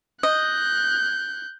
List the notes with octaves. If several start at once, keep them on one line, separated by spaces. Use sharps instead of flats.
D#5 F#6 G6